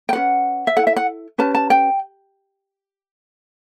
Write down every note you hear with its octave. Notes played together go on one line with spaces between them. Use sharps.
G5
C#4 F#4 B4 F#5
E5
E4 A4 F#5
E5
F#5
C#4 G4 B4 A5
A5
G5